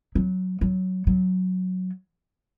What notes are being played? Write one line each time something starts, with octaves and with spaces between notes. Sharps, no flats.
F#3
F#3
F#3